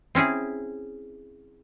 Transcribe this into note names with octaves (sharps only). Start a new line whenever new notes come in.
C4 C#4 E4 G#4